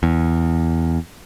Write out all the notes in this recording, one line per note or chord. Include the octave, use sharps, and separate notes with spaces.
E2